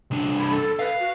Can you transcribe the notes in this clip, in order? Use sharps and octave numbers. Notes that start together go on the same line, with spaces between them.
C2 D4
B5
A4
B4 F5
F#4